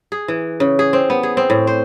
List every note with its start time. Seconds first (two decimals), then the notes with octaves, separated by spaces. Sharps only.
0.12 G#4
0.28 E3
0.60 C#3
0.79 G#4
0.93 C4
1.10 B3
1.23 G#4
1.37 C4
1.50 A2
1.67 C5